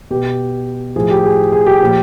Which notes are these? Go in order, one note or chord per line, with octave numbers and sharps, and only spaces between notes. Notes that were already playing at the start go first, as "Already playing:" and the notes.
B2 G4
A2 F3 G#4
G4
G#4
G#4
G4
A#2 F3